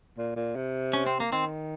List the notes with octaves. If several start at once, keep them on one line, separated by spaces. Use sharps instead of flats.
A#2
A#2
C3
C#4
C4
A#3
D#3 C4